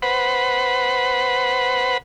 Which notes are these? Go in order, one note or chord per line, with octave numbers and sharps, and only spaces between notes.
B4 C5 F#5 B5